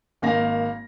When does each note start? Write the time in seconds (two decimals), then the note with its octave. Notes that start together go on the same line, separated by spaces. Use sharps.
0.22 G#1 A#3 F5 A#6